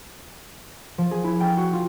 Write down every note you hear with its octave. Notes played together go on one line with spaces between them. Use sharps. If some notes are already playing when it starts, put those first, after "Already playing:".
F3
G#4
E4
G5
F#4
F4